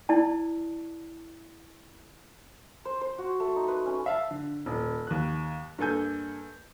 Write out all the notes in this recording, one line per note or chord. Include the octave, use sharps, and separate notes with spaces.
E4 D5 A5
C5
C5
F#4
A3
D#4
B4
C#4
E5 F5 A5
D3
D#1
D#2 F#6
G2 A#3 A4 G#5 G6